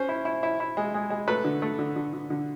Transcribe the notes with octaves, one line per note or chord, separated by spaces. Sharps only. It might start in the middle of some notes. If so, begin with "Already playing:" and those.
Already playing: C#4 C5
E4
E4
E4
E4
G#3
G#3
G#3
A3 B4
D3
A3
D3
D3
D3
D3